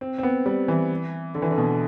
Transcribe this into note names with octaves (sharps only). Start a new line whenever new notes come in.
C4
C4
B3
G3
E3
D3
E3
D3
B2